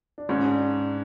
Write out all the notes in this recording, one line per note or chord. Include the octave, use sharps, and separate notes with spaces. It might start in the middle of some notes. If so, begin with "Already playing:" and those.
D4
G#2 C#4
D4